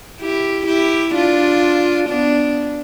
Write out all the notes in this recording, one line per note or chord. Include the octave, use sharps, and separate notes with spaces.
E4 G4
E4 G4
D4 F4
B3 D4